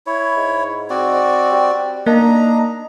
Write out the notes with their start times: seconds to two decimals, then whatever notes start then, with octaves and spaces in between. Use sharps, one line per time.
0.07 E4 C#5
0.36 G#2
0.90 C4 F#4 D5
1.51 G3
2.06 A#3 D4 D#4 A#5